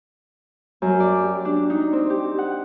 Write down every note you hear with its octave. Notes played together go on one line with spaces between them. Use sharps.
F#2
D5
G4
D4
D#4
C4
G4
F#5